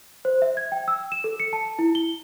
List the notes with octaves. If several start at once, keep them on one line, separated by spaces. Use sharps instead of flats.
C5
E5
G#6
G5
E6
E7
A4
C#7
A5
E4
G7